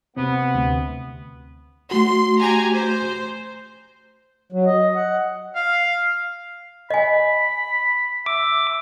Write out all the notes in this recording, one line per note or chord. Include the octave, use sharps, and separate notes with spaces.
C3 B3 C4
D2
A3 F#4 C6
G4 G#5 A#5
C5
F#3
D#5
F#5
F5
D#5 G#5 B5
E5 D6